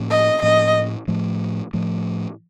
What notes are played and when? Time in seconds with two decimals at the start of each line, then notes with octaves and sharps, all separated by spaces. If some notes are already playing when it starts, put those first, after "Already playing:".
Already playing: A2 F3 A#3 C#4
0.10 D#5
0.42 A2 F3 A#3 C#4 D#5
1.08 A2 F3 A3
1.73 A2 F3 A3